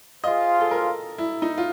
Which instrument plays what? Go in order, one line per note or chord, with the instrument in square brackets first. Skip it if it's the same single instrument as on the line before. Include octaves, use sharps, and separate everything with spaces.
[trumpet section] F4 G#4 C5 F5 [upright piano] D#5
[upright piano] A4
A#4
E4
D#4
F4